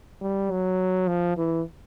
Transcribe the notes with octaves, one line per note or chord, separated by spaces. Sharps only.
G3
F#3
F3
E3